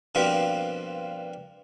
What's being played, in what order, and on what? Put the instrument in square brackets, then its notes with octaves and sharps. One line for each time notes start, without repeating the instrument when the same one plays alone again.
[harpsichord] G2 B2 F3 A#3 C4 G4